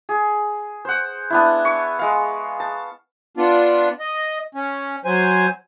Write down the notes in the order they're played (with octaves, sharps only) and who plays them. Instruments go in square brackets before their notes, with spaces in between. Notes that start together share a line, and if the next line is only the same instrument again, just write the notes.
[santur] G#4
C5 F#5
B3 D4 E4
C#6
G#3 F5
A5
[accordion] B3 D4 F4
D#5
C#4
F#3 C5 G#5